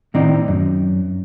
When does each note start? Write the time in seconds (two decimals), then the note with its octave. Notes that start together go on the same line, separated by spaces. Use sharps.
0.14 A2 D#3 C4 D#4 D5
0.48 F#2